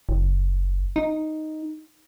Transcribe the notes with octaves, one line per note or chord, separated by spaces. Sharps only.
F#1
D#4